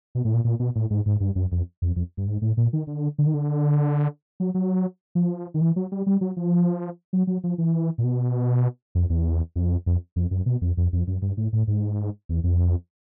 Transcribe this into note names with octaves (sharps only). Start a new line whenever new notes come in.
B2
A2
A#2
A#2
B2
A2
G#2
G#2
G2
F#2
F2
F2
F2
G2
G#2
A2
A#2
D#3
D3
D3
D#3
D3
F#3
F#3
F3
D#3
E3
F#3
G3
G3
F#3
F3
F#3
F#3
F3
E3
A#2
B2
F2
E2
F2
F2
F2
F#2
B2
F2
F2
F2
F#2
G2
A2
A2
G#2
E2
F2